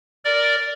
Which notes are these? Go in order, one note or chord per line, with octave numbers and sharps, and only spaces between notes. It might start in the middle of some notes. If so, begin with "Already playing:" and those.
A#4 D5